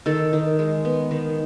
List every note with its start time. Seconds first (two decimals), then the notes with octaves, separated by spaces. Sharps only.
0.06 D#3 A4
0.33 D#3
0.59 G#3
0.85 B3
1.11 D#3